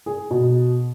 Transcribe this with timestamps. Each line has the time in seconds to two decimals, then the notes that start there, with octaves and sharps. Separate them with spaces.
0.06 G#4
0.31 B2